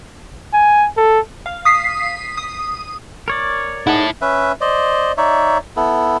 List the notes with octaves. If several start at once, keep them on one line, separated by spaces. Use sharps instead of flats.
G#5
A4
F5
D#6 B6 C7
D#6
A#4 C#5 D5
D#4 E4 G#4 F#5 A5
C#4 B4 E5
C5 D5 D#5
D#4 C#5 D5 E5
B3 E4 A4